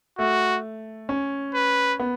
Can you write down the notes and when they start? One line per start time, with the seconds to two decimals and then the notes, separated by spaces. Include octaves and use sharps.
0.18 A3 F#4
1.09 C#4
1.54 B4
1.99 B3